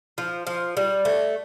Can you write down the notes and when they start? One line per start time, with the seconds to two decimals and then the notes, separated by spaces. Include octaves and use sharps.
0.18 F3
0.47 F3
0.77 G3
1.05 A3